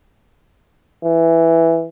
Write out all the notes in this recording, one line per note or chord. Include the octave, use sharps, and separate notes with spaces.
E3